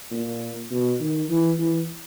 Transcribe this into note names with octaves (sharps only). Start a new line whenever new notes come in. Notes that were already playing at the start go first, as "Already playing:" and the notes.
A#2
B2
D#3
E3
E3